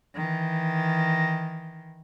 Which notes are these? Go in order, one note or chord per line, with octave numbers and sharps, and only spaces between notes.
D#3 E3